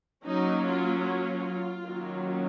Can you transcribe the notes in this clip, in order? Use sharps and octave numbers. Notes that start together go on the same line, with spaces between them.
F#3 A#3 C#4 D#4
F4
F4
D#3 F#3 A#3 C#4